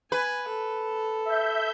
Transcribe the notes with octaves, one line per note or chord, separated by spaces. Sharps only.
B4 G#5
A4
E5 G6